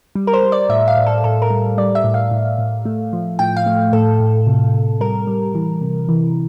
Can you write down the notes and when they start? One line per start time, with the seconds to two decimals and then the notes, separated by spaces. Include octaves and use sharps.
0.15 G3
0.27 A#4
0.33 C5
0.43 G3
0.52 D5
0.69 A2 E5
0.88 F5
0.97 A2
1.06 A4
1.24 A2 A4
1.42 A#4
1.50 G3
1.78 G3 D5
1.95 E5
2.04 A2
2.14 F5
2.31 A2
2.58 A2
2.85 A3
3.13 F3
3.39 A2 G5
3.56 F5
3.66 A3
3.92 A2 A4
4.20 A2
4.47 C3
4.74 C3
5.01 G3 A#4
5.27 G3
5.55 E3
5.81 C3
6.09 E3